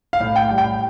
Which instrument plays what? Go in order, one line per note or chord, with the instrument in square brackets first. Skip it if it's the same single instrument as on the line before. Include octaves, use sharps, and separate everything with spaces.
[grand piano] F5
A2
G5
G3
G5